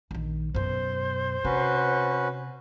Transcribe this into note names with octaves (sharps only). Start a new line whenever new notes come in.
A#1 D#3
F#2 B2 C5
C3 C#4 F#4 B4